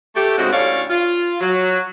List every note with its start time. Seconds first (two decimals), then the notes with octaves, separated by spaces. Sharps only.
0.15 A3 G4
0.38 D2 G#2 C#3 G#3 C4 F#4
0.52 D2 A2 C#4 C#5 D5 F5
0.90 F4
1.41 F#3